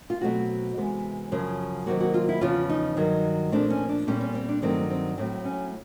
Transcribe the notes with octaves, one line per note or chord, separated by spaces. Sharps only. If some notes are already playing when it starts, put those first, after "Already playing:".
F4
B2 F#3 A3 C4 F#4
C3 E3 G#3 B3
F#2 C#3 F3
C3 D#3 F#3 A#3 F#4
F#4
F4
E4
E2 C#3 F3 F4
D#4
G2 D#3 F#3
A#2 F3 A3 C4 D4
C#4
D4
A#2 G3 B3 C#4
C#4
C4
D4
G2 D#3 F#3 A3 C4
C4
A2 F#3 A3 C4
C#4